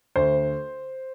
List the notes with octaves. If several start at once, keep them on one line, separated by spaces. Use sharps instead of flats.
D2 C5